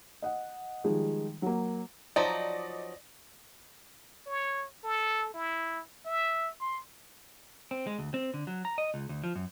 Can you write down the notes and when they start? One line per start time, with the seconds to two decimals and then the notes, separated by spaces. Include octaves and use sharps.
0.22 D#5 F#5
0.84 D#3 F3 G3 G#3 G#4
1.42 F#3 A#3
2.16 F3 F#3 D#4 D5 D#5
4.26 C#5
4.84 A4
5.34 E4
6.06 E5
6.61 C6
7.71 C4
7.87 G#3
7.99 D2
8.14 C4
8.34 D3
8.47 F#3
8.65 A#5
8.78 D#5
8.94 C#2
9.09 D2
9.24 F3
9.35 F#2